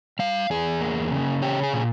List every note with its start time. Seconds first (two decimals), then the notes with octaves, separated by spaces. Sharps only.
0.19 G3 F5
0.50 E2 G#4
0.81 A#3
1.12 C#3
1.42 C#4 G4
1.63 G#4
1.73 A#2